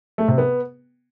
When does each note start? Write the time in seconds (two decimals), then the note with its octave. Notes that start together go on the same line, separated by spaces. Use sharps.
0.18 A3
0.28 C3
0.38 B3